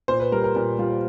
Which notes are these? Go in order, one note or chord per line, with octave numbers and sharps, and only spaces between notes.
A#2 C5
B4
G3 A#4
A#4
A#2 A#4
G3 F4